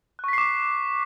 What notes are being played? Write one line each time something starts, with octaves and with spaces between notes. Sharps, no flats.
C#6 D6 F#6 B6 C7